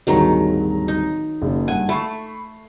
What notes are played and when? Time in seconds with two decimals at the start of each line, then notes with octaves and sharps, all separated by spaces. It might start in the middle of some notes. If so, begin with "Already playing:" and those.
0.07 D1 G2 D#3 F#3 G#3 A#5
0.88 D#4
1.42 F#1 C#3
1.68 G2 F#5 G#5
1.89 A3 B5 C#6 C7